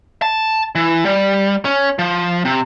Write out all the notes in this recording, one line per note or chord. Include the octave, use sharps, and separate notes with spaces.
A5
E3
G3
C#4
F3
C3